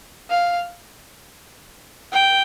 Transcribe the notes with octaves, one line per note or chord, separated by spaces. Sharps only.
F5
G5